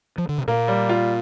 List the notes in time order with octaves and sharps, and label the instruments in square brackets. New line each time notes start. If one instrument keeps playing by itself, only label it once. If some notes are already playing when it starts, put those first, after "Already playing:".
[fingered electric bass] F3
D3
C3
[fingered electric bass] A#2 [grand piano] A#3
[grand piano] G3
F4